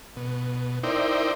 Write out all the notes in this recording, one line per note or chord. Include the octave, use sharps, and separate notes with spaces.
B2
D#4 E4 A#4 C5 D5 G5